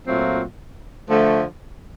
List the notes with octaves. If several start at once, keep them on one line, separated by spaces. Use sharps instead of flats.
A#2 F#3 A3 C4 F4
D3 F3 A3